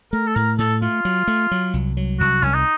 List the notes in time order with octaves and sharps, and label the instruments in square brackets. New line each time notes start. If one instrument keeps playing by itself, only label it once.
[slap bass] A3 [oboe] A#4
[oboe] A4
[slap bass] A2 [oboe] A#4
[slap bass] A2 [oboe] A4
[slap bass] A3 [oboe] F4
[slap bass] F#3
A3
F#3
C2
F#3
[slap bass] C2 [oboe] F#4
[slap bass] C2 [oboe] C#4
[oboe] D#4